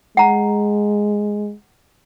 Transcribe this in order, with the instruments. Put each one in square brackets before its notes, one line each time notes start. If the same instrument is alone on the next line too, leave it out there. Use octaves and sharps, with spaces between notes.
[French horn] G#3 [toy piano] F#5 A#5